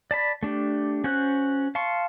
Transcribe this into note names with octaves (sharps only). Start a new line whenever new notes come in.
D5 A5 B5
A3 D4 G4
C#4 F#4 C5 F#6
F5 A5 C6 C#6